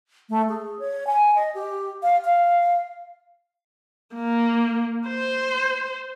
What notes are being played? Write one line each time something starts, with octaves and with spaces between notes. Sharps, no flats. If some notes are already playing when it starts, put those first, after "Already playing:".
A3
G#4
C#5
G#5
D#5
G4
F5
F5
A#3
C5